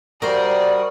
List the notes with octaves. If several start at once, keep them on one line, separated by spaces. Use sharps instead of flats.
G3 F#4 A#4 C5 D5 G5 D#6